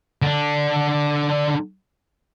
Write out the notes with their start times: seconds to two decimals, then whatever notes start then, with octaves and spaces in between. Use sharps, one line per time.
0.22 D3 D4